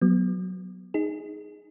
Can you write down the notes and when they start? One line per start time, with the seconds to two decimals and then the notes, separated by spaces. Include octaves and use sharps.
0.02 F#3 B3
0.94 D#4 G#4